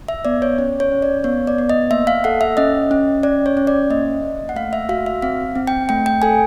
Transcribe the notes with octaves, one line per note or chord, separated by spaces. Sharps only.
E5
B3 D5
C#5
C#4 C#5
C#5
C#4
D5
B3 C#5
D5
B3
D#5
A#3 E5
F5
A4 F#5
E5
C#4 D#5
C#4
C#4 D5
C#5
C#4
D5
A#3 D#5
A#3
F#5
A3 F5
E5
F#4 F5
E5
C4 F5
C4
G5
A3 G5
G5
A4 G#5